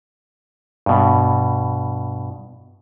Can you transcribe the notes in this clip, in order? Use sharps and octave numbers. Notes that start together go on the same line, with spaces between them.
G2 B2